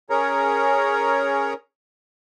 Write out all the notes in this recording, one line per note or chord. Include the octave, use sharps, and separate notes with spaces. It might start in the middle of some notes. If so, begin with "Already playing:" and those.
C#4 G#4 A#4 C#5 A#5